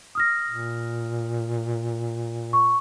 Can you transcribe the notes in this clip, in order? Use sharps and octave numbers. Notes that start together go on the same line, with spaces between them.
D#6 F6 A#6
A#2
C#6